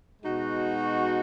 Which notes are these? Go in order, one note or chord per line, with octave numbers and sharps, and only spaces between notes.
B2 G#3 D#4 F#4